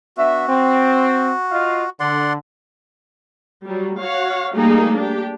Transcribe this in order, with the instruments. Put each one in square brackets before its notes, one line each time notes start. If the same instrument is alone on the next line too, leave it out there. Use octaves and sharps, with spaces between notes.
[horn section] B3 D4 E5 [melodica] F#4
[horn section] C4
F4 D#5 F5
[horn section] D3 [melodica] D5 F#5 C6
[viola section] F#3 G3
F#4 C#5 F5 F#5
G3 A3 A#3 D#4 G4 G#4
D4 G4